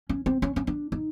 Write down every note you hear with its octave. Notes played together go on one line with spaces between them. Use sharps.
C#4
C4
C#4
C#4
D4
D#4